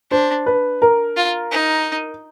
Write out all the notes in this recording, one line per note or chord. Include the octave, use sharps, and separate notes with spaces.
D4 C5
B4
A#4
F4
D#4